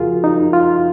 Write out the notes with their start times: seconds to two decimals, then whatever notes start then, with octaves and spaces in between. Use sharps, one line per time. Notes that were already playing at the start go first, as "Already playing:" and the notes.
Already playing: F2 C#3 F3 F4 F#4 G#4 A#4
0.24 D#4
0.53 F4